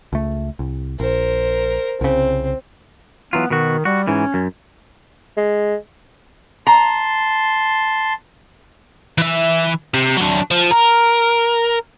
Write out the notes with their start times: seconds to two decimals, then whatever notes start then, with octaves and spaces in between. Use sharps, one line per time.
0.13 C#2 A3
0.59 C2
1.00 A#1 A#4 C5
2.01 C2 C#3 C4
3.33 E3 F#3 B3 F4
3.50 B2 D#3 F#4
3.85 G3 F#4
4.08 G#2 E3 C#4
4.34 F#2
5.37 G#3
6.67 A5 A#5 C6
9.18 E3 E5
9.94 C3
10.17 F#3 D4
10.51 F3
10.71 A#4